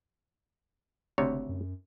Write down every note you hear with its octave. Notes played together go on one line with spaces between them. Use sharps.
F#1 D2 C3 C#5
F#2